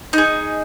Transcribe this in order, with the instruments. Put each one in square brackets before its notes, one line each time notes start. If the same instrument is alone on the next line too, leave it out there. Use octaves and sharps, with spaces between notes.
[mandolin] D#4 G#4